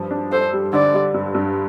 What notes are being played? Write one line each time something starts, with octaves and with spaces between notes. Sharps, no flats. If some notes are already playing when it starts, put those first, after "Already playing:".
Already playing: G2 F3
D4
A4 C5
G3
D3 D5
G3
G2
G2